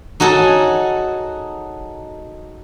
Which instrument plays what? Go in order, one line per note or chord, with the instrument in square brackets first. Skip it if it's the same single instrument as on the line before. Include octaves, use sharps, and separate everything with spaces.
[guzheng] D#4 F#4 G#4 A4 C#5